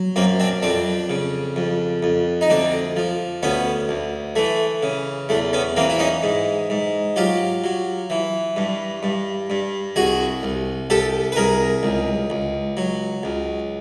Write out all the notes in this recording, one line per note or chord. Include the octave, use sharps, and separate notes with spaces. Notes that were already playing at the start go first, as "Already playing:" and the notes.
Already playing: F#3
F#2 A#3 C4
C4 D4
F2 C4 D4
C#3
F2
F2
D#4
D2 C4 D4
F3
D2 B3 C#4
D2
E3 A3
C#3
E2 A3
B3 C#4
E3 A#3 C4
E4
C#4 D#4
G#2
G#2
F#3 F4 G4
F#3
E3
G2
G2
G2
C2 F#4 G#4
C2
C2 G4 A4
B4
C2 G#4 A#4
C#2
C#2
F#3
C#2